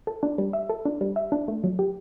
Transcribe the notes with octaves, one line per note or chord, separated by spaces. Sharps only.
A4
D4
G3
E5
A4
D4
G3
E5
D4
A3
F#3
G4